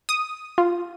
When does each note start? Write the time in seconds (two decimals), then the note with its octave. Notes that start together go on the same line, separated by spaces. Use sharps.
0.09 D#6
0.58 F4